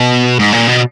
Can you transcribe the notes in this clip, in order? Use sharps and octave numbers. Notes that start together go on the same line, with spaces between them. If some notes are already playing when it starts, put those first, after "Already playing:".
Already playing: B2
G#2
A#2
B2